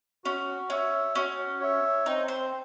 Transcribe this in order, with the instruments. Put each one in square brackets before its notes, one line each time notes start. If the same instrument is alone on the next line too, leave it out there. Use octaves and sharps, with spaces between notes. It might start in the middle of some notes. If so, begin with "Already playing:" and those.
[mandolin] C#4 [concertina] F#4
[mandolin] C#4 [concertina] C#5 E5
[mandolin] C#4 [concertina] F#4
[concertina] C#5 E5
[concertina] C4 [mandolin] D#4
[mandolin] C5